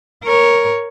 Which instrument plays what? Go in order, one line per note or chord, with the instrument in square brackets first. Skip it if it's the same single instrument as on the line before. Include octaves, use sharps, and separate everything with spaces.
[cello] A#4 C#5